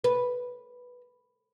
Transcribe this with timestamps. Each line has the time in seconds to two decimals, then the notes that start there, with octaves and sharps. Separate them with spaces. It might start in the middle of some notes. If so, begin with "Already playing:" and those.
0.04 B4